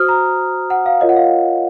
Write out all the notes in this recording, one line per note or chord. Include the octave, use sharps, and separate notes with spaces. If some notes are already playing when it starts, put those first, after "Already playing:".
Already playing: F#4 C5 D#6 F6
A#5
F#5
F5
F4 A#4 C#5 D#5
F#5
F5